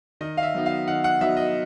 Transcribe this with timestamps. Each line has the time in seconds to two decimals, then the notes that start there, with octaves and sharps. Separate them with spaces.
0.21 D#3 D#5
0.37 F5
0.43 E5
0.55 F#3 B3 D#4
0.66 F5
0.87 D#3 F#5
1.04 F#5
1.21 F#3 B3 D#4 E5
1.37 D#5